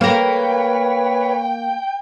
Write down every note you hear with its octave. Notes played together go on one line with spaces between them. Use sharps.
A#3 A#4 B4 C#5 G5